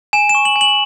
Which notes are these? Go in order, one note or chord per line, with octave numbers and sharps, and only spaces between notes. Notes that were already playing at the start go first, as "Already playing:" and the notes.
G#5 E7
E7
C#6
F#7
G#5
F#7